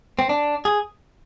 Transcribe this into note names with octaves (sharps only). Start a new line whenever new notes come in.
C4
D4
G#4